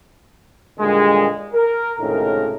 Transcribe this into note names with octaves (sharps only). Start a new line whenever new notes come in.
A#2 D3 D#3 G3 G#3
A#4
C#2 A2 C3 D#3 A3 A#4